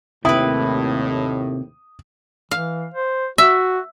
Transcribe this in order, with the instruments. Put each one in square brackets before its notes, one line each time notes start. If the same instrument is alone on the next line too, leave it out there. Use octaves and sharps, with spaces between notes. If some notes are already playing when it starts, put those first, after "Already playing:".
[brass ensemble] D#2 A2 [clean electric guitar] C3 G5 [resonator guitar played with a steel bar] E4 B4 [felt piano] D#6
[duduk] E3 [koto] F5
[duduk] C5
[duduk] F#4 [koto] E5